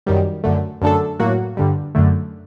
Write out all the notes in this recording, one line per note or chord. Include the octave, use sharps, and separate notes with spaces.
F#2 D#3 G3
F#2 D3 A3
F#2 D3 A3 D4 A4
A2 F#3 A#3 F#4
G2 D3 G3
F#2 D3 A3